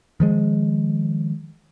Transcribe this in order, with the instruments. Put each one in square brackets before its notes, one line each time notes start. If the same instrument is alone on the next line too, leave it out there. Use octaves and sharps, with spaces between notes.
[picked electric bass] D#3 F3 G#3